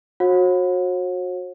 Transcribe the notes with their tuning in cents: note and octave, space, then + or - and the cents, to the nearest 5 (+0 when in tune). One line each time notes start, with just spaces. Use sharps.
F#4 -25 C#5 -45 F#5 -40